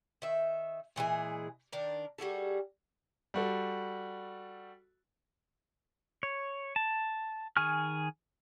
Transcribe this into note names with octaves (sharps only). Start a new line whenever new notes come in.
D#3 E5
A#2 E3 G#3 G#4
D#3 D4 A#4
G3 F#4 G#4 A4
G3 F#4 A4
C#5
A5
D#3 G#4 G#5 C#6 F6